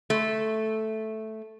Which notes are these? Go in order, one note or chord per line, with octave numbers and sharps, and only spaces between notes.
A3